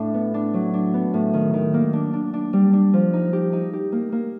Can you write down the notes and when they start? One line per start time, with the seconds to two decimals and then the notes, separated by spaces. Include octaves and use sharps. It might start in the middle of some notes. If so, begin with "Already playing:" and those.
Already playing: A2 D4
0.14 B3
0.34 D4
0.54 F#3
0.74 D4
0.94 B3
1.14 A2
1.34 D#3
1.53 D#3
1.74 A#3
1.93 D4
2.13 D4
2.33 D4
2.53 G3
2.73 D4
2.93 F3
3.13 D#4
3.33 G4
3.53 D#4
3.73 G4
3.92 A#3
4.12 A#3